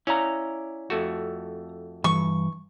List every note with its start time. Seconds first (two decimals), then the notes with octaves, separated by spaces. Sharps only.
0.07 C#4 E4 D5 F5 A#5
0.90 F2 A3 F#4
2.04 G2 E3 C#6